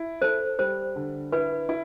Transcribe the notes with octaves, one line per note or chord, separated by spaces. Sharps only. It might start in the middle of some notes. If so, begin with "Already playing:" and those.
Already playing: E4
A4 C5
G3 C5
D3
E4 B4
E4